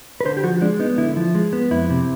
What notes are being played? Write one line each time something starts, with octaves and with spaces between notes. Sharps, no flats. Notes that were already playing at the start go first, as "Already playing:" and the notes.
B4
D3 C5
G4
F3 F#4
G#3 D4
B3 D#4
D3 E4
F3
G#3
B3
F2 E4
C3